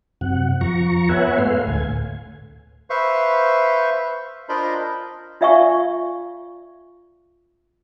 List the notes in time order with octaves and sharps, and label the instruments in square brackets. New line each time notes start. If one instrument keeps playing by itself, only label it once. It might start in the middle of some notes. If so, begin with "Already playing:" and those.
[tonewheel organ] F#2 C3 F#5
F2 F3 A#5 C#6
B3 B4 C#5 E5 F#5 G#5
G#2 A3 F5 C6
D2 A2 G#5
[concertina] B4 C5 E5 F5 C#6
D4 F4 A#4 C5 D#5 B5
[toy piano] F4 D5 E5 F5 G#5 C#6